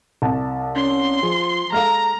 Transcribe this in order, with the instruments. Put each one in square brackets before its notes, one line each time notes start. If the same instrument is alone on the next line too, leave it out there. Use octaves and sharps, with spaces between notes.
[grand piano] C2 A5
[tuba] C#4 [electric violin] C6
[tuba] F3 [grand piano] G#4
[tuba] G#3 [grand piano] A4 F5 F6 [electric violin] A#5